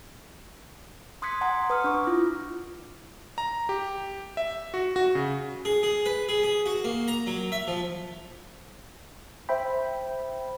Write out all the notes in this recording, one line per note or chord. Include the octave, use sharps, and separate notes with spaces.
C6 D#6 F#6 G#6 B6 C#7
F#5 G#5 A#5 C6 G#6
B4 D#6 F6
D4 C#6 D6
E4 F4
A#5
G4
E5
F#4
F#4
C#3
G#4
G#4
B4
G#4
G#4
F#4
A#3
A#5
F#3
E5
F3
C5 E5 G5 B5